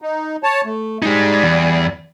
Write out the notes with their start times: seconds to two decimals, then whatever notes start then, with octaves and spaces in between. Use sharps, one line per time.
0.02 D#4
0.43 C#5 A5
0.65 A3
1.02 G3 G#3 D#4
1.42 E2